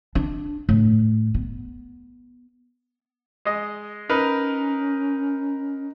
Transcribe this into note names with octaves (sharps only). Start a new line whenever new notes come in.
D4
A2
B3
G#3 D#5
C#4 D#4 A#4 B4